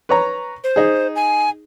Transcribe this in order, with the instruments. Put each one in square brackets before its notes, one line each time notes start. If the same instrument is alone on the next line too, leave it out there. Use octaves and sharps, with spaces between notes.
[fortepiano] B4 C#5 A#5
[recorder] C5
[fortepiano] D#4 G#4
[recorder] G#5